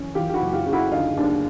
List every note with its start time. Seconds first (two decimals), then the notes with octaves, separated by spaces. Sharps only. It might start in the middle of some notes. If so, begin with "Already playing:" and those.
Already playing: F#2 E3 C#4
0.15 E3 F4 G4
0.29 G4
0.34 E4 F#4
0.41 F#1
0.53 F4 G4
0.66 C#3
0.73 E4 F#4
0.92 D3 D#4 F4
1.17 D#2 D4